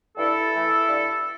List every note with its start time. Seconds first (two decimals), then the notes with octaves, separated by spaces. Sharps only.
0.17 G2 E4 A4
0.53 E3 A3
0.87 G2